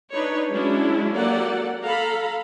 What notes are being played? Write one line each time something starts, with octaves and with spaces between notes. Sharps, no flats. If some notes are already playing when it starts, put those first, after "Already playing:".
D4 D#4 B4 C#5
F#3 G#3 C#4 D4 E4
F#3 A#3 G4 A4 D5 F#5
A4 F5 A#5 B5